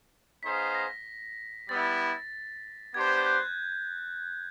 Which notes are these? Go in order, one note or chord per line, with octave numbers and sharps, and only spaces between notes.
B3 D#4 G#4 C5 F5 B6
A#6
G3 B3 E4 A6
B3 D4 G4 C5 G#6
G#6
G6
F#6